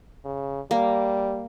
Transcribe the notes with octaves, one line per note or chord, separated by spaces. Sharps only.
C#3
G3 A#3